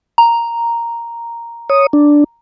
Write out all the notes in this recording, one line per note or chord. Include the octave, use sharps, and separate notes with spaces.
A#5
C#5 D#6
D4